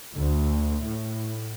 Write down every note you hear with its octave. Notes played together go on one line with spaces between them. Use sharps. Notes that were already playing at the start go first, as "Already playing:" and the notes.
D2
A2